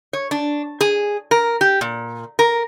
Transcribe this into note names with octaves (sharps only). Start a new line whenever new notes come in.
C#5
D4
G#4
A#4
G4
A#2
A#4